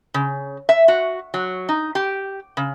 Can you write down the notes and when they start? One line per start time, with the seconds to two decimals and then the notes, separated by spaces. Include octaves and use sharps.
0.14 C#3
0.69 E5
0.88 F#4
1.34 F#3
1.69 D#4
1.95 G4
2.57 C#3